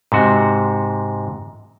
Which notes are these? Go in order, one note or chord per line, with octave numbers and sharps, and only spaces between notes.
G#2 C3 F#4